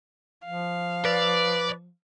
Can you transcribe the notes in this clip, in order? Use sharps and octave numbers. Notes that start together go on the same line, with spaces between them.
F3 F5
B4 D5